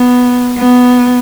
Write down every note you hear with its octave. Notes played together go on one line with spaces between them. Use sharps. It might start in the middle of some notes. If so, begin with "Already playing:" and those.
Already playing: B3
B3